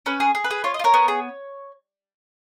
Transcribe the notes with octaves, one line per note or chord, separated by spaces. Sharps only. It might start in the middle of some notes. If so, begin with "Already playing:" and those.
C#4 B4
G#4
G#4
B4
G#4
F4 C#5
D#5
F4
A#4 C#5
B3
G#4